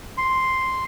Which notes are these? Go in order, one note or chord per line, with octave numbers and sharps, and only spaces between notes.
C6